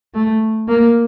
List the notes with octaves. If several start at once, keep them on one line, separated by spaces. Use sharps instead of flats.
A3
A#3